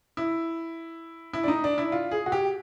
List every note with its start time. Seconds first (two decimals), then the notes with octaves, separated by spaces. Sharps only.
0.17 E4
1.33 E4
1.43 D4
1.48 D#4
1.64 D4
1.78 E4
1.92 F4
2.11 G#4
2.26 F#4
2.32 G4